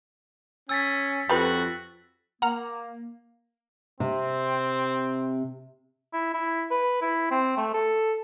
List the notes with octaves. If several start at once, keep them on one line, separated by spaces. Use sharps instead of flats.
C#4 G#5 E6 A6 B6
F2 F#4 G4 B4
A#3 F#5 A#5 F6
C3 C4
E4
E4
B4
E4
C4
A3
A4